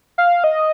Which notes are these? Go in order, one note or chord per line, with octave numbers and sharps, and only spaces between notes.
F5
D#5